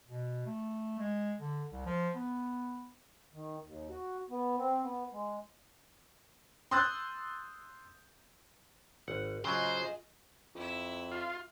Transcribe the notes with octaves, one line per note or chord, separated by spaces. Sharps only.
B2
A3
G#3
D3
C2
F3
B3
D#3
D#2
F#4
B3
C4
B3
G#3
C6 D#6 E6 F#6 G6 A6
G#1 F#5
C#3 F#3 F4 G#4 C5 D#5
F2 E4 E5
F4